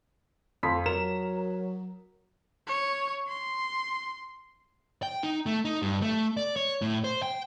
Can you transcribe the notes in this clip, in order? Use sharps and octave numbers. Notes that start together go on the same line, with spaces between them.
F2 C6 B6
F#3 A#4 E7
C#5
C6
G5
D#4
A3
D#4
G2
A3
D5
C#5
A2
C5
G5